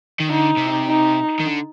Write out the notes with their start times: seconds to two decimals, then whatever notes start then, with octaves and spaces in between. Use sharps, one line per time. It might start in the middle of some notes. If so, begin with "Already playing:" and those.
0.20 D#3
0.30 D3 D#4
0.58 C3
0.87 D#4
1.40 D#3
1.45 D3